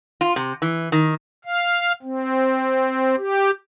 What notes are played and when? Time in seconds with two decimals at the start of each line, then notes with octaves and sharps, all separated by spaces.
0.21 F4
0.36 C3
0.62 E3
0.92 D#3
1.45 F5
2.02 C4
3.17 G4